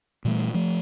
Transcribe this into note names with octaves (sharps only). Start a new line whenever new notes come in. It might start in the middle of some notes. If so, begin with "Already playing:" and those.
A#2 E3 G3 A3
F3 A3